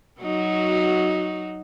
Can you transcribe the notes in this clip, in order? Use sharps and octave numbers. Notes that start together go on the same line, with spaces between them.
F#3 D#4 F#4